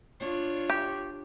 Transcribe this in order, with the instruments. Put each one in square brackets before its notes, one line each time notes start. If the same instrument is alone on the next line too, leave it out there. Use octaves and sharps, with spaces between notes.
[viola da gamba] D4 F4 C#5
[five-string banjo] G4